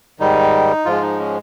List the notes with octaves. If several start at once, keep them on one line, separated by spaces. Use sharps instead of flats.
G#2 D#3 G3 D#4
G#2 F3 G#3 F4
D#4
C#4